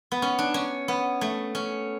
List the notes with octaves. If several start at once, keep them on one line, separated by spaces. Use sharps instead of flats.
B3
C#4
D4
C#4
B3
A3
C#4